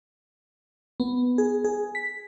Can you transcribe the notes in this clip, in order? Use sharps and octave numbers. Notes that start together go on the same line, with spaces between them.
B3
G#4
G#4
B6